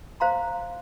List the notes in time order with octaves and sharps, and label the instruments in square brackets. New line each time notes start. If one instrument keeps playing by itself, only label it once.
[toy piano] C5 F5 A#5 C6